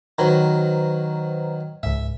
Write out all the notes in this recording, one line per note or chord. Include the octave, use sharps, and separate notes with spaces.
D#3 F#3 B4 C5 A#5
C#2 G#2 E5